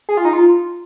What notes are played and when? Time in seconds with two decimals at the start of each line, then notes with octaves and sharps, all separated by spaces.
0.09 G#4
0.17 F4
0.25 D#4
0.33 F4